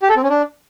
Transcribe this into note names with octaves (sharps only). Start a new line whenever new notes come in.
G4
A4
C4
C#4
D4